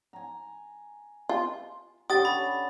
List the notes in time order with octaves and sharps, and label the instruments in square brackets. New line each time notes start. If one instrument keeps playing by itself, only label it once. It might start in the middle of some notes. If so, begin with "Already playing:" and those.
[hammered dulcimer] G#5 A#5
[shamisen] F4
[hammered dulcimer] D3 C#4 [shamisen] G4 [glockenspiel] D#6 A6
[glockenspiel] B5